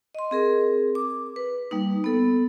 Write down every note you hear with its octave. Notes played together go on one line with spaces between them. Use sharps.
D#5 C6
C4 G#4 A#4
D6
B4
G3 A#3 D#4
B3 A4